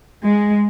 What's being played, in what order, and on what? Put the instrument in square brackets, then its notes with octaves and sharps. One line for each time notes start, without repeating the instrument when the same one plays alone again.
[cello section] G#3